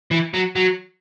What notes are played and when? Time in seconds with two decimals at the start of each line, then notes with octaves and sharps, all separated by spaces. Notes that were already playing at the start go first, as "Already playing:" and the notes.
0.11 E3
0.34 F#3
0.56 F#3